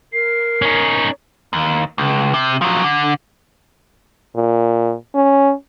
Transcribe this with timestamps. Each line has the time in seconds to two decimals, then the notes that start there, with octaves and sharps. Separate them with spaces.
0.13 A#4 C7
0.62 C#4 D#4
1.53 D#2
1.98 C#2
2.34 C3
2.61 F3 F#3
2.84 D3
4.35 A#2
5.14 C#4